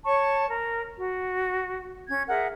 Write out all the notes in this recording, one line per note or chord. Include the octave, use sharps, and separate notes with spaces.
C#5 A5 C#6
A#4
F#4
C#4 G#6
G#4 A#4 E5 F#5